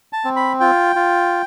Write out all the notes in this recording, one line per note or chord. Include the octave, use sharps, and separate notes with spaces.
A5
C4
B5
F4 G5
F4